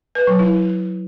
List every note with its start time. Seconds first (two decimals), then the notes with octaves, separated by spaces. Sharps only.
0.15 B4
0.27 F#3
0.39 E4